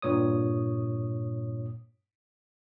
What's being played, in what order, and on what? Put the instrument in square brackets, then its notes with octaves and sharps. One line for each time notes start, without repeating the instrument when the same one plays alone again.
[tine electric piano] G2 A#2 C#5 D#6